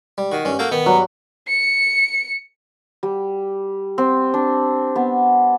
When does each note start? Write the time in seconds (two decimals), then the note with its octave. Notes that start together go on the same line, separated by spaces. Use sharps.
0.18 G3
0.32 D#3 F#4
0.45 G2 C#4
0.59 A#3 F#4 A4 G5
0.71 D#3 B3
0.86 G2 F#3
1.48 C#7
3.03 G3
3.98 C4
4.34 D4
4.96 B3